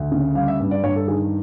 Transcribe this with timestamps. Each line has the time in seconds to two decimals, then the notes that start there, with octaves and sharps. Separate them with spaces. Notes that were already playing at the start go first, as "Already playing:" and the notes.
Already playing: D2
0.12 C#3
0.35 G3 F5
0.48 E5
0.60 G2
0.71 D5
0.83 G2 C#5
0.96 A4
1.07 D#3 G#4